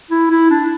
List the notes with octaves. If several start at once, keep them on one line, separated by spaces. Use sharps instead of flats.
E4
E4
D4